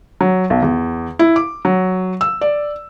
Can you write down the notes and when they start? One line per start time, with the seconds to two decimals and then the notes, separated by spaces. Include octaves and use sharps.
0.21 F#3
0.50 B1
0.62 E2
1.19 E4
1.36 D6
1.65 F#3
2.21 E6
2.41 D5